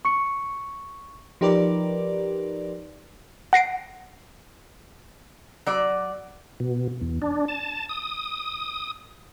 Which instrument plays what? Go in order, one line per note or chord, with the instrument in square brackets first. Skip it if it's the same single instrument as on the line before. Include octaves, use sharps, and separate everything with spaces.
[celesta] C#6 C#7
[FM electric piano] F3 D#4 G4 A#4 B4 D5
[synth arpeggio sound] F#5 A#6 C7 D7
[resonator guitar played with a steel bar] F#3 D5
[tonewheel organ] B2
E2
D4
A5
D#6